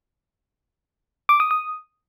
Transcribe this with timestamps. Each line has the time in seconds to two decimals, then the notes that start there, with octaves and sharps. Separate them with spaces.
1.29 D6
1.40 D#6
1.51 D#6